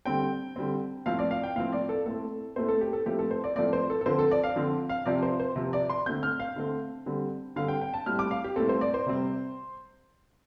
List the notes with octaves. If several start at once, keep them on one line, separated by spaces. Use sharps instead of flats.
D3 G3 C4 G5
D3 G3 C4
A2 F3 C4 F5
D5
F5
G5
A2 F3 C4 F5
D5
A4
A2 A3 C4 A4
A2 A3 C4 C5
A4
G4
A4
A2 F3 A3 C4 G4
A4
C5
D5
A2 F3 A3 C4 D5
C5
A4
A4
D3 F3 C4 C5
A4
D5
F5
D3 F3 C4
F5
C3 F3 C4 D5
C5
C5
C3 F3 C4
D5
C6
D3 A3 C4 G6
F6
F5
D3 A3 C4
D3 G3 C4
D3 G3 C4 F5
G5
G5
A5
A2 G3 C4 F6
D6
F5
G4
A2 G3 C4 A4
C5
D5
C5
C3 G3 C4